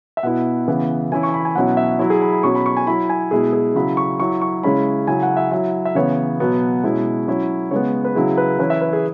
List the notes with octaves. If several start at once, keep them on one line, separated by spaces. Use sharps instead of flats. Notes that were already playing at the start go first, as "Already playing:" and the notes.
E5
B2 B3 E4 F#5
C#3 E3 B3
E3 C#4 E4 G#5
C#6
G#5
B5
G#5
B2 F#3 C#4 E4 F#5
E5
F#3 E4 C#5
G#4
B5
B5
B2 F#3 C#4 C#6
B5
C#6
G#5
F#3 E4 B5
G#5
B2 G#3 E4 G#4
G#4
C#3 F#3 E4 B5
C#6
F#3 E4 C#6
C#6
C#3 G#3 C#4 E4 B5
C#3 F#3 C#4 E4 G#5
F#5
E5
F#3 E4 E5
E5
C#3 E3 B3 C#5
B2 F#3 B3
B2 G#3 C#4 E4
F#3 C#4 E4
C#3 G#3 B3 C#5
B4
C#3 F#3 E4 G#4
B4
E3 C#4 E4 B4
E5
B4
G#4